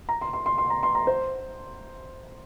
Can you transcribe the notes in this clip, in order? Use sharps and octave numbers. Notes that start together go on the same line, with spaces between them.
A#5
C6
C6
C6
C6
A#5
C6
A#5
C5